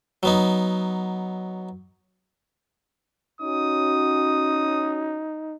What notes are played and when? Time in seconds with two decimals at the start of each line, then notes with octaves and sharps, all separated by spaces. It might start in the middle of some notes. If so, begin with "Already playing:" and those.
0.23 F#3 B3 D#4
3.41 C#4 D#4 F#4 D#6